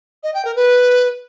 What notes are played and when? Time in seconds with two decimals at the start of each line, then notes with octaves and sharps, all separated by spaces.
0.23 D#5
0.34 G5
0.45 A#4
0.56 B4